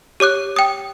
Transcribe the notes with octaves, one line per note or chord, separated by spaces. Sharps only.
G4 C#5 D6 F#6
G5 D#6